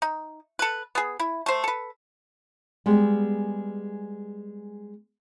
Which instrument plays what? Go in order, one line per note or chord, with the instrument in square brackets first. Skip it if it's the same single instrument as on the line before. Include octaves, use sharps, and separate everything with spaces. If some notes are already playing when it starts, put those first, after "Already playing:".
[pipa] D#4
A4 B4
B3 G#4
E4
A3 C5
A4 B4
[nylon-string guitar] G3 G#3 B3